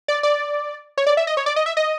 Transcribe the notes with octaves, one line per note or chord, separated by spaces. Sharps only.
D5
D5
C#5
D5
E5
D#5
C#5
D5
D#5
E5
D#5